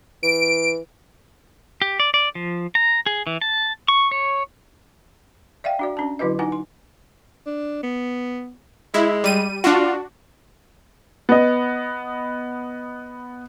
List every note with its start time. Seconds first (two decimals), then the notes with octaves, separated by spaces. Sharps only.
0.23 E3 D7
1.82 G4
2.00 D5
2.14 D5
2.35 F3
2.75 A#5
3.06 G#4
3.27 E3
3.41 A5
3.88 C#6
4.11 C#5
5.64 D5 E5 F5 G5
5.79 D4 F#4 D5
5.97 C#4 D4 A5
6.19 D3 F#3 E4 F#4 B4 D#5
6.39 D#4 F4 F#5 G#5
6.52 C6
7.46 D4
7.83 B3
8.94 G#3 E4
9.24 G3 D#7
9.64 D4 F4 F#4
11.29 B3 D#5